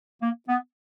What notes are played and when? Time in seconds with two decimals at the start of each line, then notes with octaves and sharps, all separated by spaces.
0.22 A#3
0.48 B3